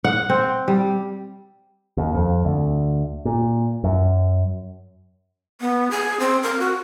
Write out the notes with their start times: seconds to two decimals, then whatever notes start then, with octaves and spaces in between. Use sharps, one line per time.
0.04 F#5
0.30 C4
0.68 G3
1.97 D#2
2.14 F2
2.45 D2
3.25 A#2
3.84 F#2
5.61 B3
5.91 G#4
6.20 C4
6.43 A#4
6.59 F#4